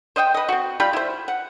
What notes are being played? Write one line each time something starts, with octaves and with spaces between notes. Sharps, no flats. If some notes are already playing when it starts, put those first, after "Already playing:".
C5 D#5 F#5 G5
B4 D#5
C4 F#4
G3 F4 G5 B5
E4 C5
F#5